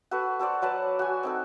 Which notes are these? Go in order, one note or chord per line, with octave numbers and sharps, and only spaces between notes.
F#4 A4 B4
F#4 A4 C5 D5
F#3 B4 F#5 A5
F#4 G#5
C4 D#4 A4